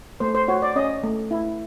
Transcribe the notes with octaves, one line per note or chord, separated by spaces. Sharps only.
A3 C5
C5
F#4 C#5
D5
C#4 D#5
A3
E4